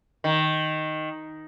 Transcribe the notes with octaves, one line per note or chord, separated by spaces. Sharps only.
D#3